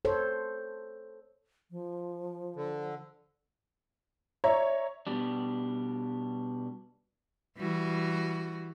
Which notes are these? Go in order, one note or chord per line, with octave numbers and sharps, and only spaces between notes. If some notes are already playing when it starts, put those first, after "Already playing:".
A4 C5 C#5
F3
D3
C#5 D5 E5 A#5
B2 G3 D4
E3 G3 F#4